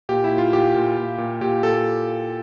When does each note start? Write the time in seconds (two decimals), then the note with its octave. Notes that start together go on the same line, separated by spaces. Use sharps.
0.09 A#2 G4
0.24 E4
0.31 A#2
0.38 F4
0.53 A#2 G4
0.75 A#2
0.97 A#2
1.18 A#2
1.41 A#2 G4
1.63 A#2 A4